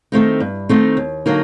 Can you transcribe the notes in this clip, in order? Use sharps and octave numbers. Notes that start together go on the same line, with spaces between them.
D#3 A3 C4 D#4
G2
D#3 A3 C4 D#4
D#2
D3 F#3 A#3 D#4